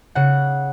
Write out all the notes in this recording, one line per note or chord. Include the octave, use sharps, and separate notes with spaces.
C#3 F#5